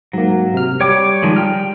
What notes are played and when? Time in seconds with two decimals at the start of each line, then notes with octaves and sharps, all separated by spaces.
0.13 G#2 F#3 A#3
0.54 C3 F6
0.81 G3 C#5 G5 D6
1.23 D#3 F3 G#3
1.36 G5 F6